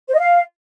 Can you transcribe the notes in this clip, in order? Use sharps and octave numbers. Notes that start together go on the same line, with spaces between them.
C5
D#5
F5